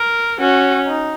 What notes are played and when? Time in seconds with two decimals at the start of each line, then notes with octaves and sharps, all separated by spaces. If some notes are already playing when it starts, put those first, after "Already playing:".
Already playing: A#4
0.40 C#4 F#4
0.87 D#4